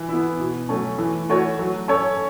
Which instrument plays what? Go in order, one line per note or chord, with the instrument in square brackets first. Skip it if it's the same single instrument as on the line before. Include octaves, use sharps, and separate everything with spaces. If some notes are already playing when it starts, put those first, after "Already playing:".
Already playing: [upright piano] E3
B3 E4
B2
F#3 A3 C#4
E3
A3 F#4 C#5
F#3
C#4 A4 C#5